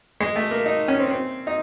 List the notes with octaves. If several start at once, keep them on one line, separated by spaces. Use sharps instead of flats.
G#3
A3
A#3
D#4
C#4
C4
C4
D#4